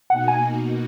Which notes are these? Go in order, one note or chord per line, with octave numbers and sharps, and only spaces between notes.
B2 A#3 D#4 F#4 F#5
G#5